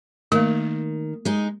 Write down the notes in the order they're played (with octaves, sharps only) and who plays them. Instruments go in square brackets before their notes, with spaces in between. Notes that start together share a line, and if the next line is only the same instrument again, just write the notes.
[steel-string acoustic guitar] D#3 [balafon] A3 A#3
[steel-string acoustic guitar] G#3 D#4